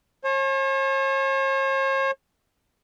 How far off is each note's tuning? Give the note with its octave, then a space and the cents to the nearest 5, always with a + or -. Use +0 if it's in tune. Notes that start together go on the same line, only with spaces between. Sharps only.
C#5 -45 A5 -35